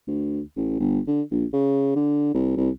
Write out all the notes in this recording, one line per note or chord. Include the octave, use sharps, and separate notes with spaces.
D2
A1
G1
D3
A#1
C#3
D3
C2
C2